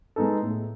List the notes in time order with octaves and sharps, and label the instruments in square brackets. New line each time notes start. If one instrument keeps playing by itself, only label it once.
[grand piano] G#3 B3 D#4 A4
A2